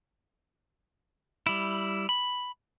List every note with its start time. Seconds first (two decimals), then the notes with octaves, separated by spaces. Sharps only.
1.47 G3 E4
2.09 B5